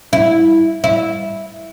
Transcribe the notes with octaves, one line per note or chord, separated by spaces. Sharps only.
E4
E4